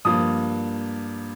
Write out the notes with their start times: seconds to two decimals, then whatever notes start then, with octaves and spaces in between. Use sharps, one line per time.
0.05 G2 F3 A#3 D#6